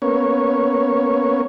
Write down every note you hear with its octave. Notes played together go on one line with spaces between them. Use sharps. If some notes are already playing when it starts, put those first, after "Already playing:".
A#3 B3 C#4 C#5